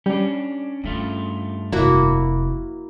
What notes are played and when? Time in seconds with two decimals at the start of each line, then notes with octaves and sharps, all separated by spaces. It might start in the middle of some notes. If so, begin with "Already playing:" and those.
0.06 G3 C#4 D4
0.84 G2 A3 C#4 F4
1.72 F1 A#3 E4 F#4